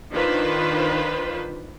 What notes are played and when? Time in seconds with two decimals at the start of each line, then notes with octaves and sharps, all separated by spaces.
0.12 D#3 D4 F4 B4 C5